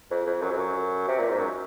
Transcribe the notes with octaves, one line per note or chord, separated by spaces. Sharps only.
F2
F2
F#2
F2
F#2
C3
A#2
G#2
F#2